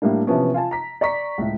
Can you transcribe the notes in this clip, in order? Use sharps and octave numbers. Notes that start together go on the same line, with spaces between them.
A2 G3 A#3 D4
C3 E3 F3 B3 C#4
F4 G#5 A5
A#5 B6
D5 A#5 C#6 B6
C#2 A2